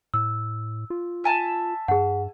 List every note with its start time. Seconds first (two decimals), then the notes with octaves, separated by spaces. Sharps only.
0.14 A2 E6
0.90 F4
1.24 E5 G#5 A5
1.88 G2 G#4 F#5